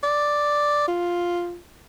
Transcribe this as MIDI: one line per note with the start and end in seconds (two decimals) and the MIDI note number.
0.03 0.87 74
0.88 1.59 65